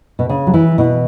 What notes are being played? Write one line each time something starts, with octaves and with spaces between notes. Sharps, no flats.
B2
C#3
F#3
E3
B2